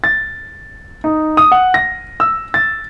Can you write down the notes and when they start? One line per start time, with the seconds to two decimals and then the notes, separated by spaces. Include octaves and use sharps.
0.04 A6
1.04 D#4
1.37 D#6
1.52 F#5
1.74 A#6
2.20 E6
2.54 A6